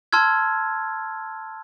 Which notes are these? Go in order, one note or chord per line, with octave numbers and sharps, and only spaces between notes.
A5 C6 E6 F6 G#6